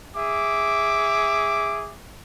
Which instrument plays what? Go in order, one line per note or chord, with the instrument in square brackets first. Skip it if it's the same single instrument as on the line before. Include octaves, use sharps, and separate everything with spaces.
[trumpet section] G#4 E5 D6